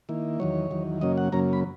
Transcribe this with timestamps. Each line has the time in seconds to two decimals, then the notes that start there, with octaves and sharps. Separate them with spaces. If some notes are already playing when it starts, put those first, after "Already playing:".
0.09 D#3 A#3 E4
0.40 E2 D#3 F#3 C#5
0.71 E2 D#3 F#3
1.01 F#2 C#3 F#3 A#3 C#4 D#5
1.18 F#5
1.32 F#2 C#3 F#3 A#3 C#4 A#5
1.53 B5